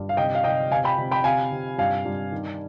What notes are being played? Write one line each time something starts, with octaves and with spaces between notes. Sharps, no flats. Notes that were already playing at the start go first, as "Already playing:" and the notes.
Already playing: G2
F5
C3 D#5 G5
F5
C3 D#5 G5
C3 F5 G#5
G5 B5
C3
G5 B5
C3 F5 G#5
C3
G2 F5 G#5
G2
D#3